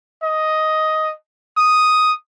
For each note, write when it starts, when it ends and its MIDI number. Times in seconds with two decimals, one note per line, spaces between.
0.23 1.13 75
1.57 2.13 87